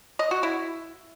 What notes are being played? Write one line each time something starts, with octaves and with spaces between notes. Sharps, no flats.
D#5
F#4
E4